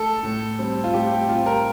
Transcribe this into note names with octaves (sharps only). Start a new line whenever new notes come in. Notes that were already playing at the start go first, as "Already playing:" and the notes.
Already playing: A3 A4
A2
G3 C4
F4
A2 G4
G4
G3 C4 F4
A#4